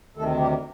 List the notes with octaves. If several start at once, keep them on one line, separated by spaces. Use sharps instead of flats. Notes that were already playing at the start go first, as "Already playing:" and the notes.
D2 C3 D#3 A3 A4
G3 G4